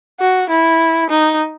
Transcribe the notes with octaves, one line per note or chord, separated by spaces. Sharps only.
F#4
E4
D#4